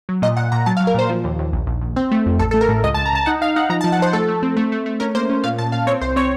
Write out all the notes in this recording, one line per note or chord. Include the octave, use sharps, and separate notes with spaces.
F#3
A#2 D#5
A#2 F#5
A#2 A#5
F#3 A5
F5
F#3
A#4
A#2 C5
F3
D#2
D#2
A#1
A#1
A#1
C4
A3
F2
A1 A4
A4
A3
A#4
A2
C#2 D#5
A5
C#2
A#5
C#2 A5
D#4 F#5
D#4 F5
D#4 F#5
F3 A#5
A5
F3
F#5
F3 C5
A3 A4
A3
C4
A3
A3
A3
C#4 A#4
A#3 C5
C#4
A#2 F5
A#2 A5
A#2 F5
C4 C#5
C2 C5
C4 C#5